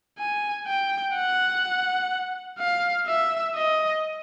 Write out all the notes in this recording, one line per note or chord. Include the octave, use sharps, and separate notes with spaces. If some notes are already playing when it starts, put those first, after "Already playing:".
G#5
G5
F#5
F5
E5
D#5